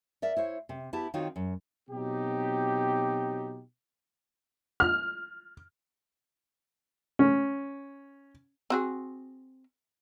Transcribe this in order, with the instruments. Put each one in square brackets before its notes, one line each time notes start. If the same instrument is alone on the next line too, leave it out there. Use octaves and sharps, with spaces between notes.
[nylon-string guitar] A#4 D5 E5
E4 C5 C#5
C3
B3 E4 G4 A5
D#3 C4 D#4 F4 F#4 C#5
F#2
[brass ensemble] B2 F#3 C4 D#4 G4
[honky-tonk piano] F6
[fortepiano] C#4
[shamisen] C4 F#4 G#4